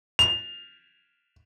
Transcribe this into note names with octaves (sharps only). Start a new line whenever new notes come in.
F7